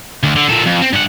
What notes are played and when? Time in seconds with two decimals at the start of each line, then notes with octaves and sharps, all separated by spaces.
0.23 D2
0.36 D3
0.49 A#2 A4
0.66 F2
0.81 C4
0.93 G2 F#5